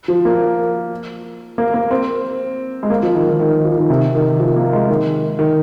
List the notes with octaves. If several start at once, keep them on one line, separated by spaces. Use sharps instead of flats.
F3
A#3
A#3
A#3
C4
G#3
A#3
F3
D#3
D#3
D#3
F3
D#3
C3
D#3
F3
A#3
G#3
D#3
D#3